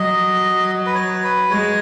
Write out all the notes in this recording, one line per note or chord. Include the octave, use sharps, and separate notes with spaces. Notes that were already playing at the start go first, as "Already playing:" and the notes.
Already playing: F#3 D#5
B4
C#5
B4
G#3 C#5